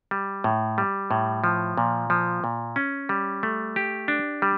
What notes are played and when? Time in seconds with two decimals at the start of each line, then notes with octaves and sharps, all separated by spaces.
0.11 G3
0.44 A2
0.78 G3
1.11 A2
1.44 F3
1.77 A#2
2.10 F3
2.44 A#2
2.76 C#4
3.09 G3
3.43 A3
3.76 G4
4.08 D4
4.42 G3